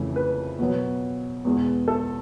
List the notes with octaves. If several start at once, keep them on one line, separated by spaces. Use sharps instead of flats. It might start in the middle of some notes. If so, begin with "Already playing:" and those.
Already playing: F2 C#3 E3 A3
B4
B2 F#3 B3
E2 B2 G#3
A4